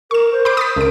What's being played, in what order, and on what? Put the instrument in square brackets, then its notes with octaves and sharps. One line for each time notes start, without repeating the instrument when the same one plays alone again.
[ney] A#4 [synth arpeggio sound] C#6 E7
[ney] C5
[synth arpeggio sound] B5 C6 D6
D#6 A6 B6
[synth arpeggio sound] C#2 D7 [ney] A#4